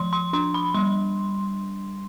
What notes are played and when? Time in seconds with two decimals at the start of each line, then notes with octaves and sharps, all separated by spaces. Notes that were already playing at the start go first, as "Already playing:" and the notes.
Already playing: F3 C6
0.13 C6
0.33 D4 C6
0.54 B5
0.74 G3 C6